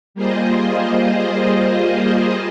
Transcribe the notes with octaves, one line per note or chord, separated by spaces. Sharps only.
G3 A#3 F4 G#4 C5 D#5